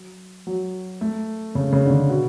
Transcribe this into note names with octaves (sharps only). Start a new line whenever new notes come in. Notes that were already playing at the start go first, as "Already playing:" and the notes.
Already playing: F#3
F#3
A3
C#3
C#3
D3
C#3
B2